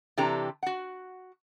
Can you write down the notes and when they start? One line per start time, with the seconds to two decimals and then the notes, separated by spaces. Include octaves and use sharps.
0.17 C3 E3 D4 G4 A4 A#5
0.63 F#4 F#5